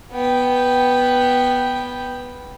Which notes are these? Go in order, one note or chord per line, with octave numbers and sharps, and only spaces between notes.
B3 G5